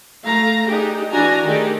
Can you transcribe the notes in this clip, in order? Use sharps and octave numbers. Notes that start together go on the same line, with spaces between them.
A3 F5 A#5
D4 D#4 G4 G#4
E3 D4 F#4 G#5 A#5
D#3 A3 D#4 G4 G#4 D5